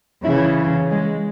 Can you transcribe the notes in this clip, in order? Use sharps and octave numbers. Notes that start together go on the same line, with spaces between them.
C#3 E3 E4
G#3